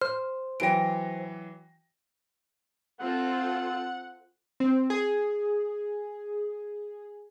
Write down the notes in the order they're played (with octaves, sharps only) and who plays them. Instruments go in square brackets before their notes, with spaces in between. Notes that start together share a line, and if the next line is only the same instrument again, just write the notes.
[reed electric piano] C5 [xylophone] F6
[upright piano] E3 F#3 A#6 [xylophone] G5 D7
[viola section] C4 F4 A4 [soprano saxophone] F#5
[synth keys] C4
G#4